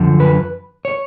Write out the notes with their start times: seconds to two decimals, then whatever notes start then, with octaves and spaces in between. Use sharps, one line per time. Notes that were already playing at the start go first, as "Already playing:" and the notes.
Already playing: F#2 D3 F3
0.20 B4
0.85 C#5